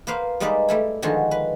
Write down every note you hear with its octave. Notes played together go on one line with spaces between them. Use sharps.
A#3 B4 C5 F5
G3 G#3 A#3 D#4 B4 D5
G3 A3 E4
D3 D#3 F3 G#3 F#4
B4